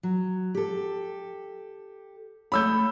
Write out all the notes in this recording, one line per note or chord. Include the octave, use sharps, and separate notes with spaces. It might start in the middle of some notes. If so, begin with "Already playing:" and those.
F#3
G4 A4
A3 C#5 B5 E6 G6